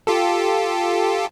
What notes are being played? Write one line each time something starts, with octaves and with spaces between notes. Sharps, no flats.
F4 G4 A4